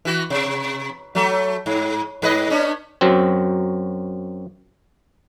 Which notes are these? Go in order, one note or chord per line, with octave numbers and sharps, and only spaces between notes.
E3 F#4
C3
F#3 A3
G#2
G#2 B4 D#5
B3 C#4 D4
F#2 F#3 C4